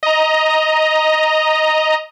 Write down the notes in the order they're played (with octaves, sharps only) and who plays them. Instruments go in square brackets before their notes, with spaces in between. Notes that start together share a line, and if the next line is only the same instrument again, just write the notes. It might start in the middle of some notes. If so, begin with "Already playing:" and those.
[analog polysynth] D#5 A#5